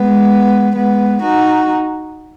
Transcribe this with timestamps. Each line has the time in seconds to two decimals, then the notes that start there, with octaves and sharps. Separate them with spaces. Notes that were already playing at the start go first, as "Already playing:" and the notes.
Already playing: G#3 B3
0.75 G#3 B3
1.22 D#4 F#4